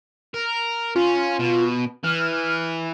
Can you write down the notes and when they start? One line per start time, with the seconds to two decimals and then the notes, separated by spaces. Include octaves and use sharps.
0.34 A#4
0.96 C#4 F4
1.39 B2
2.04 E3 F6